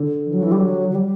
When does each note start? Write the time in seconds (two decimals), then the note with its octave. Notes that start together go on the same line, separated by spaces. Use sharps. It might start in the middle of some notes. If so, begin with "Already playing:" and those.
Already playing: D3
0.25 E3
0.33 F#3
0.42 E3
0.51 G3
0.60 F#3
0.90 F#3
0.94 G3